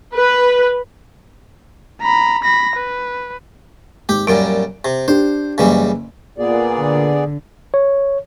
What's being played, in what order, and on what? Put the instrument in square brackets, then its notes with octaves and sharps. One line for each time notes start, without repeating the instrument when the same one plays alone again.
[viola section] B4
[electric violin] A#5 B5
B5 A#6
B4
[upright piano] G#1 [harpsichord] G4
[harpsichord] F#2 A#2 G3 [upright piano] D7
[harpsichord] C3
[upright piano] D4 G4 [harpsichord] C5
[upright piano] F#1 E5 [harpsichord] C#3 E3 G3
[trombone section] A#2 [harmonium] B3 G#4 D5
[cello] D3
[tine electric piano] C#5